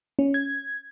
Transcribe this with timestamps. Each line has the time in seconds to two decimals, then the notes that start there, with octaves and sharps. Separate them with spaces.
0.19 C#4
0.34 G#6